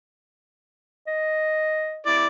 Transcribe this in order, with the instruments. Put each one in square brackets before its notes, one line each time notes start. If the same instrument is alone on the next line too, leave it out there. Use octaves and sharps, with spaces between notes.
[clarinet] D#5
[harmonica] E4 D5